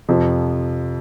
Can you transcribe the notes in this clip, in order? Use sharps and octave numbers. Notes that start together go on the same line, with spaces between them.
F2 C3 F3